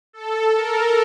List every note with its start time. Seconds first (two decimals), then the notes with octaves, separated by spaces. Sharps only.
0.13 A4
0.56 A#4